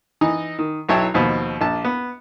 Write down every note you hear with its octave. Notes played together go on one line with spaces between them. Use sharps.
E3 D#4 D#5
D#3
B1 F#3 E4 C#5 G5 A5
D#2 B2 F3
A#1 A5
B3